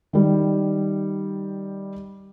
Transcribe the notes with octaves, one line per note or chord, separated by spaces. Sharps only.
D#3 G3